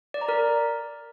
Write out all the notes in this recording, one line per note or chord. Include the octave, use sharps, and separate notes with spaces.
D5
A#5
A#4